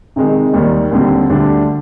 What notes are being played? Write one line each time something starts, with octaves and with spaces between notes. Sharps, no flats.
C3 D#3 G#3 D#4
D#2 D#3 G3
D#2 D3 G3 C4
D2 D3 G3 D4